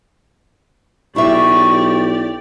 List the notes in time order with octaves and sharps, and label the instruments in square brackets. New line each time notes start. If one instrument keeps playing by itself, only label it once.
[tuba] B1 [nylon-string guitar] E4 G#4 E5 [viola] G4 D5 [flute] C#6